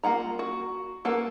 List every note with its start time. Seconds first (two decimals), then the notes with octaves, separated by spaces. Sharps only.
0.03 A#3 F4 F#5 A#5
0.39 F#4
1.05 A#3 A4 B4 F#5